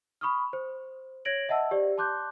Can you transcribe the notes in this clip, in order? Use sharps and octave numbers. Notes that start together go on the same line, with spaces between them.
B5 C#6 D#6 F6
C5
C#5 G#6 A#6 D7 F#7
D#5 E5 F#5 A5 E6
G4 C5 D5
A5 C6 D6 F#6 G6